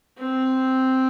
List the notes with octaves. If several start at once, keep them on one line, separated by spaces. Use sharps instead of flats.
C4